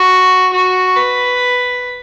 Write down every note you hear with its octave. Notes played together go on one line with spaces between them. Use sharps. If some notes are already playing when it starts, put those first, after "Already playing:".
Already playing: F#4
F#4
B4